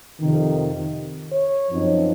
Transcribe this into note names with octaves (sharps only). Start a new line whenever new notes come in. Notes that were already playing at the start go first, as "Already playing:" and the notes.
F2 C3 D#3
C#5
F#2 F3 C4 D#4